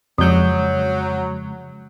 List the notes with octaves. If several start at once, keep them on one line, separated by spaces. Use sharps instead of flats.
F2 C#3 F3 F#3 G#3 G6